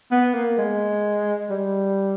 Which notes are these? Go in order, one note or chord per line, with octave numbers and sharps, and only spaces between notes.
B3
A#3
G#3
G3